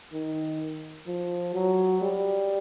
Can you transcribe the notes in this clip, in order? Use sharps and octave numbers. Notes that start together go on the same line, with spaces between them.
D#3
F3
F#3
G3